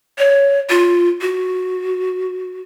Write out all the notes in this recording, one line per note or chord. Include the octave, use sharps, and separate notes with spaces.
C#5
F4
F#4